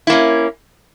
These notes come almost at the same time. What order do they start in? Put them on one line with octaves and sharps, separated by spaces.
E4 A#3 C#4